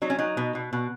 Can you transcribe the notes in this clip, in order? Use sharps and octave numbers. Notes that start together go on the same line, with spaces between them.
F#3 D#4
C#4
F#3 D#4
B2
B2
B2